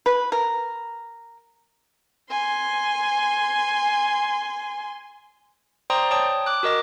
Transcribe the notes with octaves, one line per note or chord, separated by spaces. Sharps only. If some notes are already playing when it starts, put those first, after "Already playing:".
B4
A#4
G#5 C6
C5 D5 G5 A#5 C6 D#6
C#5 G5 A5 D#6
D6 F#6
F#4 A#4 D#5 D6